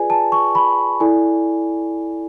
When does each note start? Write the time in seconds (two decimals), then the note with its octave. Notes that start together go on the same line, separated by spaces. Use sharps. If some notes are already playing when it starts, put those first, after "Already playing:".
Already playing: F4 G#4 B4 D5 G#5
0.10 A5
0.32 C#6
0.55 B5
1.00 E4 A4 D5 G#5